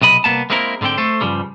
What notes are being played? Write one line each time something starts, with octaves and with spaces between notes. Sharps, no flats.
B1 C3 D#5 B5
C2 C3 A#3 B3 A5
G#3 A#3 C4 E4 G#4 A#4
G#2 D3 F3 C4 G5
A3 A4 C5
G2 C#3 F3 G3